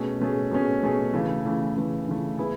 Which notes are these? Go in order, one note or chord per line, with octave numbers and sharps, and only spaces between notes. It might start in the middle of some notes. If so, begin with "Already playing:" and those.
Already playing: B2 A3 C#4 G#4
B2 A3 C#4 G#4
B2 A3 C#4 G#4
B2 A3 C#4 G#4
C#3 E3 A3
C#3 E3 A3
C#3 E3 A3
C#3 E3 A3
E3 B3 E4 G#4